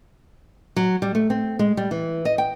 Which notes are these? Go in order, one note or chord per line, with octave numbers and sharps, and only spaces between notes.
F#3
G3
A3
C4
G#3
G3
E3
D#5
G5